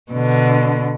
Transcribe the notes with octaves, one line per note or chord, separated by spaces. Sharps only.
B2 D3